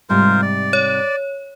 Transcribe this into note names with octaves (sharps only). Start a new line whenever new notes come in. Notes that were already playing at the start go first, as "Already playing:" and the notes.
G#2 C3 G3 F4 A#4 C5
D5
C#5